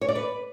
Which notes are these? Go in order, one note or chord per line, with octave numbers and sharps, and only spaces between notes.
C#5
D5
B4